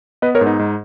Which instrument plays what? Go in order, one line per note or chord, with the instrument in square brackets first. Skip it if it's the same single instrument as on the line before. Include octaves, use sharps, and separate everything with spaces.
[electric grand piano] B3 B4 D#5
A#4 C#5
G#2
D#4
G#2